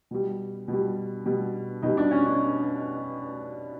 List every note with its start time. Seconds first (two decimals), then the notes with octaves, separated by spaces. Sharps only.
0.11 B2 G3
0.68 B2
0.73 G3
1.26 B2 G3
1.82 B2 G3 D#4
1.97 D4
2.11 C#4
2.26 D4